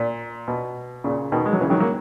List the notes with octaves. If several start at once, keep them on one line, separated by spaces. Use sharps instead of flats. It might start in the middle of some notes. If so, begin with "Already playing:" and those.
Already playing: A#2
B2
A#2 C#3
B2 D#3
G#3
F#3
C#3 E3
D#3 F#3
F#3 A#3